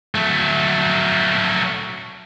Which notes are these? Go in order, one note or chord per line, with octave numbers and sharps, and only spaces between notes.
F#3 A3